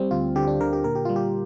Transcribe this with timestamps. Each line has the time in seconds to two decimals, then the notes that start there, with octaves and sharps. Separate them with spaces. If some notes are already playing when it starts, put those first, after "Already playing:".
Already playing: G3 C4
0.11 D2 F4
0.35 D3 G4
0.47 D4
0.60 D3 A#4
0.73 G4
0.84 A#2 A#4
0.95 G4
1.05 G3 F4
1.16 G4